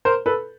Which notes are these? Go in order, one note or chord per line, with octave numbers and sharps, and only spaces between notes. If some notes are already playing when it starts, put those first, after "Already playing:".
A#4 C5
A4 B4